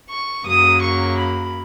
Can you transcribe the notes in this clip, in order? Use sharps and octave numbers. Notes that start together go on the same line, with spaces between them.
C#6
F#2 C#3 F#3 A#3 D#6
C#6
B5